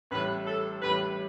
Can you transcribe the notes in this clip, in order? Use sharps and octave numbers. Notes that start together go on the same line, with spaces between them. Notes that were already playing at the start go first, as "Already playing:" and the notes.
A1 A2 G3 B4
A4
A1 A2 G3 B4